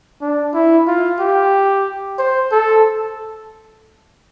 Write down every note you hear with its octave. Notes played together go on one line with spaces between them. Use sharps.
D4
E4
F4
G4
C5
A4